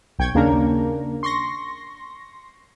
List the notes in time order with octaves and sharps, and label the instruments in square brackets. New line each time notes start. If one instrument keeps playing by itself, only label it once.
[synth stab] B1 G5 C#6 G#6
D#2 C#3 A#3 D4 A#4 A#5
C6 C#6 A#6